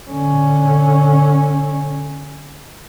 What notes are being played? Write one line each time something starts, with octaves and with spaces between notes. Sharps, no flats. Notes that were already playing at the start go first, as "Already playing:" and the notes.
D3 C#4